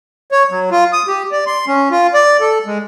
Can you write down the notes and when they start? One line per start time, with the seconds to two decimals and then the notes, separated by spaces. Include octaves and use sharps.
0.32 C#5
0.51 F#3
0.71 F4
0.93 D#6
1.07 G4
1.32 D5
1.47 C6
1.67 C#4
1.91 F4
2.14 D5
2.41 A4
2.66 G#3